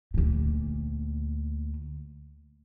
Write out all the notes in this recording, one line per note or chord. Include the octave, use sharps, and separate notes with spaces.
D2 A#2